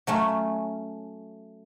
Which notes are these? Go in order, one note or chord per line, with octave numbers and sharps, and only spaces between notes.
F#3 A3 C#4